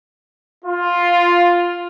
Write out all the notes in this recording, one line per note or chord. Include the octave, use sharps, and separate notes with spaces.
F4